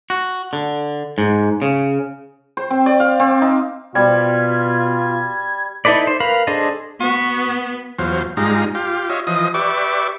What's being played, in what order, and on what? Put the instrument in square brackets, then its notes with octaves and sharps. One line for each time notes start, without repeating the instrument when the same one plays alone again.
[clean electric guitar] F#4
D3
G#2
C#3
[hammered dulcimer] C5
C4
D5
F5
C4
D#4
[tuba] B2 [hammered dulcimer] G3 [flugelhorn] F4 [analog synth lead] G#6
[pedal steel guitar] D#4 E4 A4 B4 D5
C5
A#4 B4 F5 B5
D4 G#4 A4 C5 D#5
[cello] B3 [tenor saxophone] F#4
[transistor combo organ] E2 F#3 F4 C5
G#2 G3 G#3 D#4 F4 A#5
F4 G4
F4 C#5 D#5 E5
E3 F3 D#5 D#6
G4 B4 D5 E5 C#6 D6